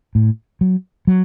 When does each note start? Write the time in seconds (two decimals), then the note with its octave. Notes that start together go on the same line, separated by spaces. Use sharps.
0.15 A2
0.61 F#3
1.07 F#3